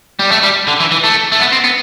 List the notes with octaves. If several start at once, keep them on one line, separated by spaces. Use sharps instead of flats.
G3
A3
G3
D3
E3
E3
A3
A3
B3
C4
B3